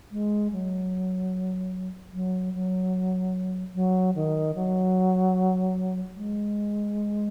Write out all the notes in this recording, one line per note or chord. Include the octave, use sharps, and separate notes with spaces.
G#3
F#3
F#3
F#3
F#3
D#3
F#3
G#3